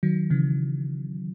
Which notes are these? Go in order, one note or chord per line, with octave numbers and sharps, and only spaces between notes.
D#3 F#3
C#3 E3